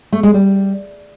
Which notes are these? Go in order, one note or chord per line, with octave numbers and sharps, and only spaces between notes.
A3
G#3
G3